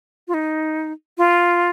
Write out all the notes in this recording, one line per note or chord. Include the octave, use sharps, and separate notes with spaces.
F4
D#4
F4